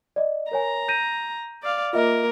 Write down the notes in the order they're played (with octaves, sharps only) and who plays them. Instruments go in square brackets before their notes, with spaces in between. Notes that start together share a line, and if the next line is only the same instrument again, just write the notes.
[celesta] D5 D#5
[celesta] A#4 C#5 G#5 [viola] A#5
[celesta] G6 A#6 D#7
[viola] D5 F5
[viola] A#3 A#4 [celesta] F4 D#5 E5